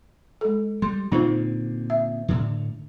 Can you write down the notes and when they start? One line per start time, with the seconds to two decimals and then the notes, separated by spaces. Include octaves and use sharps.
0.41 G#3 A4
0.82 G3 C6
1.12 A#2 D3 C4 D#4 F4 C5
1.90 E5
2.28 A2 D3